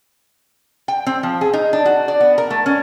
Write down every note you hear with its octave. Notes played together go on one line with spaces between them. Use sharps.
G5
C4
F3
G#4
D#4
D4
F#4
D5
B3
A#4
A3
C#4